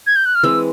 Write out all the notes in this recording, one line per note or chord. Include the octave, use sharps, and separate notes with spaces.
G#6
G6
F#6
F6
E3 G#3 C4 E6